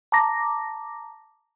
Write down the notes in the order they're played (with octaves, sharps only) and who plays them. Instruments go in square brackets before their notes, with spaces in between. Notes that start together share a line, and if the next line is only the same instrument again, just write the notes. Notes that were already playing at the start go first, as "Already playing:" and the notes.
[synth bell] A5 A#5 D6 A#6